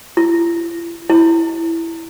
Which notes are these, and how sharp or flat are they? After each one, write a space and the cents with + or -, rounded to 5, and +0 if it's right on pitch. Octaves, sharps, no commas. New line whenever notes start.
E4 +40
E4 +5